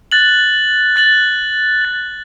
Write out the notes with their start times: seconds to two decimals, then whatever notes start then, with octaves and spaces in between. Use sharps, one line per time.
0.12 F#6 A6 F#7
0.96 F#6 A6 F#7
1.81 A6 F#7